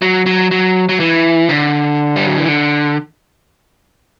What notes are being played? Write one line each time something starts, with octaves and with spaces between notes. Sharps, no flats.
F#3
F#3
F#3
F#3
E3
D3
G3
F#3
E3
D3